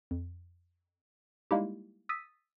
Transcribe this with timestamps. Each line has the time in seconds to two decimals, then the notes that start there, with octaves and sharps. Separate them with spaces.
0.11 F2
1.51 G3 G#3 A#3 D#4 E4 G4
2.09 D#6 E6 A6 B6 D#7